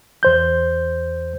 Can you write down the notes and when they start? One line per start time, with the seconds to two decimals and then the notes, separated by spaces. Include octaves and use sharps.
0.23 E2 C5 G6